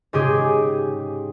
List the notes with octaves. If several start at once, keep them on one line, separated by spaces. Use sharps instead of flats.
G#2 C#3 G4 G#4